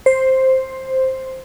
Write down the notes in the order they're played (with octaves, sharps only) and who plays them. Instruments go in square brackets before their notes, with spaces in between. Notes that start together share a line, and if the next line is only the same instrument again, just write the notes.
[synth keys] C5